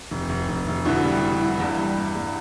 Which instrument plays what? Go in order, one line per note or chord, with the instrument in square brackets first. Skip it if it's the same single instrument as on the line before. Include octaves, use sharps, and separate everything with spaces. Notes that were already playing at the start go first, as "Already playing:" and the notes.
[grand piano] F1
F1
F1
F1
[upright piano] B2 D3 [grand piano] E3
[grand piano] G3
G3
E3
[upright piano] E2 [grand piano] G2
[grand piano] G3
G2
G2